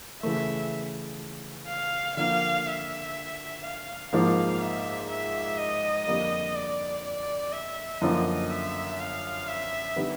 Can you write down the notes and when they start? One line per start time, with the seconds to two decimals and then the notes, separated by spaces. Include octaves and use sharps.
0.22 C#3 E3 A3 E5
1.68 F5
2.17 D3 F3 A#3 F5
2.67 E5
3.64 F5
4.12 G#2 F3 A#3 D#4 F5
4.61 E5
5.09 E5
5.58 D#5
6.07 F2 D3 G3 A#3
6.55 D5
7.05 D5
7.53 E5
8.01 F#2 D3 F3 A#3 D#5
8.50 E5
8.99 F5
9.48 E5
9.96 D3 G3 B3 D#4